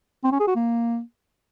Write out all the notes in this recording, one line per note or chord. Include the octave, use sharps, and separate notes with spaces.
C4
C#4
G#4
F#4
A#3